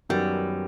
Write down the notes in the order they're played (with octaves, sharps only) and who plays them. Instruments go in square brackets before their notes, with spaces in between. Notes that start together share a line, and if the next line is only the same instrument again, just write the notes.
[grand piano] F#2 D#3 F#3 B3 [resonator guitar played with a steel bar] G3